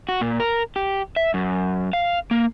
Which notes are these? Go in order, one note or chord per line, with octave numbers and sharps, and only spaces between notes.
F#4
A#2
A#4
G4
E5
F#2
F5
A#3